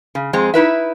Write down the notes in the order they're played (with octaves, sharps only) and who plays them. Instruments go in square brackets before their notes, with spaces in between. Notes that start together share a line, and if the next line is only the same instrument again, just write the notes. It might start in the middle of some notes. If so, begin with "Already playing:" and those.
[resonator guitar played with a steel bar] C#3
F2 G#3 C4
D#4 E4 B4 E5